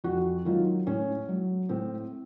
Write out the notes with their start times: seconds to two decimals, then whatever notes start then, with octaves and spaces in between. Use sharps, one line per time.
0.04 F2 F#4
0.45 D#3 F#3 F4
0.87 A2 C#4
1.29 F#3
1.69 A2 C4